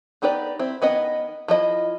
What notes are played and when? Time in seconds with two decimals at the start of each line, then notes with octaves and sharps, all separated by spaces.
0.22 B3 D#4 G4 B4 D5
0.59 C4 E4
0.82 D#3 B3 C#4 D#5
1.48 F3 E4 D#5